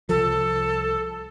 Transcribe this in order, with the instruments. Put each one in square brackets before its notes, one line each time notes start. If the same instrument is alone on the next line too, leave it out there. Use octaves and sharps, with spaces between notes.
[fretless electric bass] C2 F3 [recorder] A4